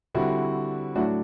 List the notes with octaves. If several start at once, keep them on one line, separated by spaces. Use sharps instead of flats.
D3 G3 C4 E4 F#4
A2 F#3 A3 D4 E4 F#4